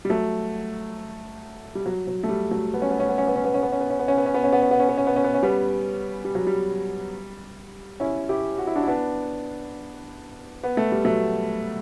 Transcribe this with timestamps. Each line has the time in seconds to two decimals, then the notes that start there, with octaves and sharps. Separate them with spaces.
0.05 G3
0.10 F#3 A3
1.75 G3
1.86 F#3
2.07 F#3
2.24 A3
2.29 G3
2.51 F#3 A3
2.74 B3
2.82 C#4
2.91 B3
3.00 C#4
3.09 B3
3.18 C#4
3.27 B3
3.36 C#4
3.44 B3
3.54 C#4
3.62 B3
3.72 C#4
3.80 B3
3.90 C#4
3.99 B3
4.08 C#4
4.17 B3
4.26 C#4
4.34 B3
4.44 C#4
4.53 B3
4.62 C#4
4.71 B3
4.80 C#4
4.89 B3
4.97 C#4
5.07 B3
5.16 C#4
5.24 B3
5.34 C#4
5.43 G3 B3
6.25 G3
6.35 F#3
6.47 G3
8.00 C#4 E4
8.29 E4 G4
8.58 F#4
8.67 E4
8.75 D4 F#4
8.83 E4
8.87 B3 D4
10.64 B3
10.77 A3
10.92 G3
11.05 F#3 A3